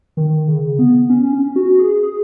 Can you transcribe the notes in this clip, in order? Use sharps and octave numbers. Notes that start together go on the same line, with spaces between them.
D#3
C#3
B3
C#4
C#4
F#4
G#4
G#4